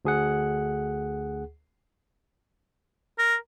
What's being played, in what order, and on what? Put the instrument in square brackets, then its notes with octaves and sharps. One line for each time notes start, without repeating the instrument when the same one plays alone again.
[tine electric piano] D2 G#4 F#5
[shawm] A#4